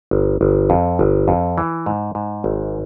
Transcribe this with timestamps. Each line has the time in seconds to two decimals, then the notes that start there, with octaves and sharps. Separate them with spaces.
0.11 G1
0.41 G1
0.70 F2
0.99 G1
1.28 F2
1.58 E3
1.86 G#2
2.15 G#2
2.44 G#1